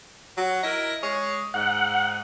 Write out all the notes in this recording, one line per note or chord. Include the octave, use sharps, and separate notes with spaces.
F#3
E4 A#4 D#5
G#3 G#4 C#5
G#2 F#5